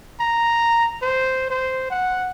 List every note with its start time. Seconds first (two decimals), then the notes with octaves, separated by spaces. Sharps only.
0.20 A#5
1.03 C5
1.50 C5
1.91 F#5